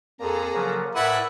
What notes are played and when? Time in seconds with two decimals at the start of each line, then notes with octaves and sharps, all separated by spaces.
0.20 F2 A#3 G#4 A4 A#5
0.54 C#3 F3 F#3
0.95 A2 A#4 B4 D5 E5 F#5 G#5 F#6